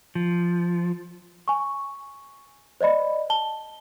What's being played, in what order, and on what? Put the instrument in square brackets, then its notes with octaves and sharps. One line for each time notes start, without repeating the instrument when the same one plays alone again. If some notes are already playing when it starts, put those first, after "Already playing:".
[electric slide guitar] F3
[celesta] G#5 C#6
C5 D5 D#5 B5
A5 G7